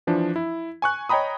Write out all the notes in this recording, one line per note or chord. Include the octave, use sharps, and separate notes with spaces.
E3 F3 D4
E4
G#5 C#6 F#6
C#5 D#5 G5 A#5 B5 D#6